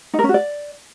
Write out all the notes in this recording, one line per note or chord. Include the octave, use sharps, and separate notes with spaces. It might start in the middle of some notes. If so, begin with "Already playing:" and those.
D#4
A#4
C#4
F#4
D5